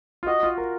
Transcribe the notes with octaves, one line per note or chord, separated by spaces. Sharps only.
F4
F#4 D#5
F4
A#4